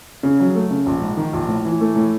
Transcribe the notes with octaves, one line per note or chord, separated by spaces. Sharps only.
C#3
F#3
A3
C#3
A#1
G#2
D#3
A#1
A2
E3
A3
A2